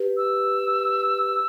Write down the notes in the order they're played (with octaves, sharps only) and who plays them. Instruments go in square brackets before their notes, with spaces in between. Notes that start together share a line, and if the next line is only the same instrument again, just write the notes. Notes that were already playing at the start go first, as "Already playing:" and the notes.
Already playing: [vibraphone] G4 B4
[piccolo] E6